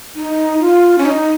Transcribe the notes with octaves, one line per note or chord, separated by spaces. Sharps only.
D#4
F4
C#4
D#4